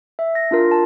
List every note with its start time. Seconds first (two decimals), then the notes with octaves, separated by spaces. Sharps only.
0.19 E5
0.35 A#6
0.51 D4 F4 A#4
0.71 A5